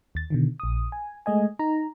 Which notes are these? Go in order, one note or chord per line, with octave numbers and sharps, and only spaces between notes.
D#2 A6
B2 D3 D#3
A#1 D#6
G#5
G#3 A3 D#5 G#5
D#4 A#5